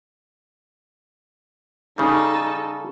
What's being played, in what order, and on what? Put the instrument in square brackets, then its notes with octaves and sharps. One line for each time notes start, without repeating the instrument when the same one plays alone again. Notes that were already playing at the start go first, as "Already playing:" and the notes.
[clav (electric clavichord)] C#3 G3 [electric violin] D#4 A4